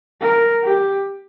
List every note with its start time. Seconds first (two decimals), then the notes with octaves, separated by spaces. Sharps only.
0.21 A#4
0.64 G4